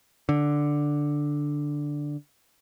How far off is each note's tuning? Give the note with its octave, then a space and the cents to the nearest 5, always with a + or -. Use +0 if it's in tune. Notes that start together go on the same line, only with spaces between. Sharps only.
D3 +0